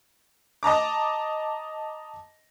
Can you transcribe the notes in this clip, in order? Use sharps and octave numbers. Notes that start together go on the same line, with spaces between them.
D#5 A5 A#5 D6